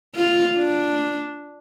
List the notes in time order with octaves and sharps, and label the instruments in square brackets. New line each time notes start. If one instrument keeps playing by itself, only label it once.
[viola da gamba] F4
D4